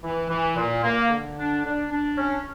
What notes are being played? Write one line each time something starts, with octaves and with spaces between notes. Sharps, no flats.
E3
E3
A#2
A#3
D3
D4
D4
D4
C#4